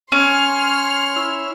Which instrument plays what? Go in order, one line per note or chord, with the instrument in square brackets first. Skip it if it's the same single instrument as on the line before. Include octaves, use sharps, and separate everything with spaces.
[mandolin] C#4 [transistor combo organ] C#5 [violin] C6 F6
[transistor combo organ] E4